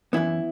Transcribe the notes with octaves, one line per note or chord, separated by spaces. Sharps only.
F#2 E3 B3 E4